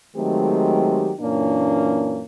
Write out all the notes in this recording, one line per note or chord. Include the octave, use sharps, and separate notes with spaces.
D#3 F#3 G#3 A3 C4 G4
F#2 A#2 E3 A#3 C#4 D4